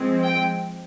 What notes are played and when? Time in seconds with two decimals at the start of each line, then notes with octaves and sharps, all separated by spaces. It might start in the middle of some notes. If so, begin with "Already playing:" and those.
Already playing: F3 G#3 C4
0.23 G5